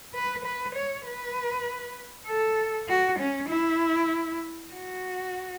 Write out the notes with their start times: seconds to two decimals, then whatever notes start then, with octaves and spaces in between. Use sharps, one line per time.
0.15 B4
0.45 B4
0.75 C#5
1.06 B4
2.27 A4
2.89 F#4
3.19 C#4
3.50 E4
4.72 F#4